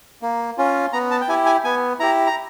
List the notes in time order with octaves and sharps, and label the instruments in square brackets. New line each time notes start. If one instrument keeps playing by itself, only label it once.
[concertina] A#3
C#4 F4
B3 A#5
A5
G5
E4 G4 G#5
G#5
B3 G#5
E4 G4 A#5
A#5